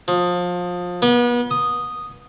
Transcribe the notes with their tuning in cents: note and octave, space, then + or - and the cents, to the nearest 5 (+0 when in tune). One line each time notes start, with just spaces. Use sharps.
F3 +25
B3 -35
D#6 -5